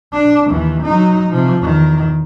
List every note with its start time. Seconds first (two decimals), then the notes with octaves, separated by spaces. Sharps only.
0.13 D4
0.50 D#2 E3
0.83 F#3 D#4
1.30 C3 F3
1.60 E2 D#3